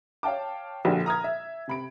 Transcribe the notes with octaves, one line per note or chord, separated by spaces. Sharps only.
C#5 F5 G5 A5 D6
A#1 A#2 D3 A#3 F#4 G4
A#5 D#6 F6 G#6
E5
C3 B5 D7